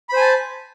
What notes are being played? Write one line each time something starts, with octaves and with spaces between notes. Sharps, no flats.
C5 G#5 A5 B5